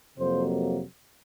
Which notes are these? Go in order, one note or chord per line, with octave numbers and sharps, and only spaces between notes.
F2 C3 F#3 A#3 C5